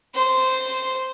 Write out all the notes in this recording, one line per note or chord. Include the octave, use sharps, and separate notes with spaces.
C5 C6